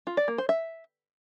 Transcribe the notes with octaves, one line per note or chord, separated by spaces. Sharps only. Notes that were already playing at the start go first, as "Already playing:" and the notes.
F4
D5
A#3
C5
E5